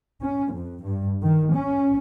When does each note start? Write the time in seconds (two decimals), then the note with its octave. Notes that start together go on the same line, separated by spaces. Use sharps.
0.22 C#4
0.52 F2
0.83 G2
1.21 D#3
1.54 C#4